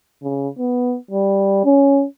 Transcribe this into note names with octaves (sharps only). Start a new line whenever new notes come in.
C#3
B3
G3
C#4